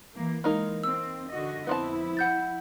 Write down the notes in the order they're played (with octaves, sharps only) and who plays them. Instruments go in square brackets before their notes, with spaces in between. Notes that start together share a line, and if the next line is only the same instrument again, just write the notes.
[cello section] E3 A#3
[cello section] E3 G#3 [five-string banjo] A#3 D#4 A#4
[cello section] C4 [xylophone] E6
[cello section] D3 F#4 D#5
[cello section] F2 E4 [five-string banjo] B3 C4 A5
[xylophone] F#5 G6 A6